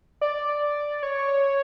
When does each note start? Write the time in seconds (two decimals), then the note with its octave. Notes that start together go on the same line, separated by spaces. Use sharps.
0.21 D5
1.03 C#5